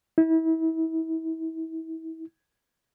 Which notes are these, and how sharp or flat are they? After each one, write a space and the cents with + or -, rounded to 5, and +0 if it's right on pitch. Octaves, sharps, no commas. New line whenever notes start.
E4 -35